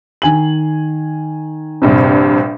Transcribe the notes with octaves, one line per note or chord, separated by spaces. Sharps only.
D#3 G#5 F#7
A#1 G2 C3